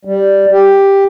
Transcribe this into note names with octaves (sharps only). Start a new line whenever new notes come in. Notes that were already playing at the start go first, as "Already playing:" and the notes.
G3
G4